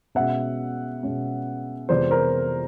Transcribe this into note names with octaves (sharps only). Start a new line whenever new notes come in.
B2 G#3 C#4 E5 F#5
B2 G#3 C#4
F2 C3 E3 G#3 B3 C5 D5
A#4 C5